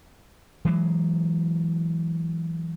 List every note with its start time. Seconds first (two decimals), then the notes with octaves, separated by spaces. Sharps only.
0.65 E3 F#3 G#3